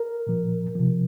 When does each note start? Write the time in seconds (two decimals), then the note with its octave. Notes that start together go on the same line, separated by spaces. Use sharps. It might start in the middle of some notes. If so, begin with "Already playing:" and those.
Already playing: A#4
0.27 A#2 F3
0.75 C3 F3